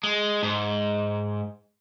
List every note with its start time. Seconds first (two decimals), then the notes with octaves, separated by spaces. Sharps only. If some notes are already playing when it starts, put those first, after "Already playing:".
0.03 G#3
0.43 G#2